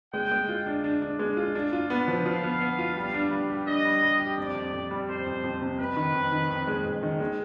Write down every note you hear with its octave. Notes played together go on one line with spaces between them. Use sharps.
G#3 G5
G#3
F4
D4
D4
D4
G#3
F4
D4
F4
B3
F3
F3 F5
B3
B3
F4
G3
D4
G3
G4
D4 D#5
G3
G3
G4
F2 D5
F2
F2
G3
F2 C5
F2
F2
C3
F2 B4
D#3
F2
D#3
F2
G#3
F2
D#3
G#3